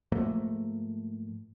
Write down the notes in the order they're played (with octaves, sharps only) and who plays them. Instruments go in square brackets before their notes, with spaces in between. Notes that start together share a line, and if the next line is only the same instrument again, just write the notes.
[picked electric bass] G#2 F3 A3 A#3